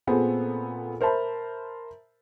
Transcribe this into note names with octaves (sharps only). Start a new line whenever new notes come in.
A#2 B3 C4 G#4 A4
A#4 C5 E5 A5 B5